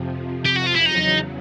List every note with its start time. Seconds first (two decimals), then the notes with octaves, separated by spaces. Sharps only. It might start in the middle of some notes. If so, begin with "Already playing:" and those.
Already playing: F2 C3 F3
0.46 G4
0.57 F#4
0.67 F4
0.76 E4
0.86 E2 C#3 F#3 D#4